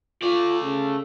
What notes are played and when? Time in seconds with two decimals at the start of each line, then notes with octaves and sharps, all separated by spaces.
0.22 A3 F4 D5
0.63 C#3